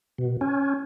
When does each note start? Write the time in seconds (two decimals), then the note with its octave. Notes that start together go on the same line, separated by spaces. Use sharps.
0.18 B2
0.41 C#4